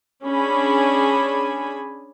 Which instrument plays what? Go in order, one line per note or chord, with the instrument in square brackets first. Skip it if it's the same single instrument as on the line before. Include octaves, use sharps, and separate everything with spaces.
[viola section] C#4 D4 G#4 G#5 B5